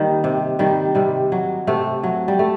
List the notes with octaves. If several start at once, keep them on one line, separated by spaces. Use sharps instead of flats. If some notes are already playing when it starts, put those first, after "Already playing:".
Already playing: D#3 G3 A#3
C3
D#3 G3
C3 G3
F#3
C3 A3
F#3
G3
A3